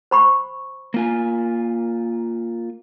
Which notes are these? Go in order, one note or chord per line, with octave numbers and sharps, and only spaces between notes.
C5 B5 C#6
A#3 F4 G#5